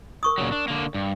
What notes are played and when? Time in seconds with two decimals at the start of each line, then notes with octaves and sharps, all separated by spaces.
0.23 A#4 C#6 D#6
0.38 A#2 C#3 F#3
0.52 D4
0.68 D3 A#3
0.94 G2